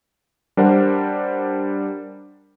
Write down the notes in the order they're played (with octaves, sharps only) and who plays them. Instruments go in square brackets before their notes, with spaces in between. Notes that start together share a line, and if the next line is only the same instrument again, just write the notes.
[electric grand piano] G3 D4 A#4 C5 F#5